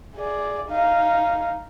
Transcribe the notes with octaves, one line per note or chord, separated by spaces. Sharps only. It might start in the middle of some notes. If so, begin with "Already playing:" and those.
G#4 D5
D#4 F5